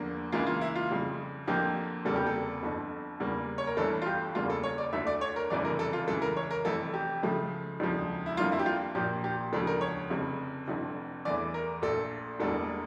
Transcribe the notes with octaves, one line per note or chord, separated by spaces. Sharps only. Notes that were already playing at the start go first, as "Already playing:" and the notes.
Already playing: E2 D3 F3 A#3
C#2 C#3 E3 A#3 F4
F4
E4
F4
F2 C#3 G3
F2 D3 F3 A#3 G4
F1 E2 C#3 G3 A#3 A4
G4
A4
G1 F2 D3
E2 C#3 G3 A#3
C#5
A#4
G1 G2 E3 A3 A4
F4
G4
E2 C#3 G3 A#3 F4
A4
C#5
D5
D2 D3 A3 E5
D5
C#5
A#4
F1 F2 C#3 E3 G3 D5
A#4
A4
F4
C#2 C#3 E3 A4
A#4
C#5
A#4
F1 F2 E3 A3 A4
G4
C#2 C#3 F3 A3
E1 D2 C#3 F3
E4
F2 D3 G3 A#3 F4
E4
G4
F4
A#1 A#2 F3 A#3 G4
G4
E1 D2 C#3 F3 A4
A#4
C#5
F1 F2 C#3
F1 F2 D3
E2 E3 A3 D5
A#4
A#1 A#2 A3 A4
E1 E2 D3 G3 A#3 A4